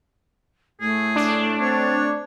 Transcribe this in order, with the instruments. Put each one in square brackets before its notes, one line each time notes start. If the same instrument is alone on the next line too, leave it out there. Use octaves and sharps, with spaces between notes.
[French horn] A2 [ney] A3 [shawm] G#4
[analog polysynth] D4
[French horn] C4 [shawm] C#5